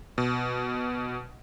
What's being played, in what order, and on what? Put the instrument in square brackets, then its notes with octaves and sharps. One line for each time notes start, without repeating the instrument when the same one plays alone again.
[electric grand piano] B2